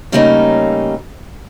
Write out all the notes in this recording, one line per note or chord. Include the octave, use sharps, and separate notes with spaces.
C#3 G3 A3 A#3 C#4 D#4